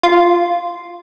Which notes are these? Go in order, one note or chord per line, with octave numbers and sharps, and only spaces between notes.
F4